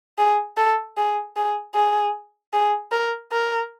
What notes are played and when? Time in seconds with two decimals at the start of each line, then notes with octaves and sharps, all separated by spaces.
0.18 G#4
0.57 A4
0.97 G#4
1.36 G#4
1.74 G#4
2.53 G#4
2.92 A#4
3.32 A#4